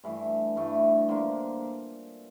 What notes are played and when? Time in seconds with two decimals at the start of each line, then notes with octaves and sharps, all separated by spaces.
0.04 G2 E3 A3 E4
0.56 G2 E3 A3 E4
1.09 D3 F3 A#3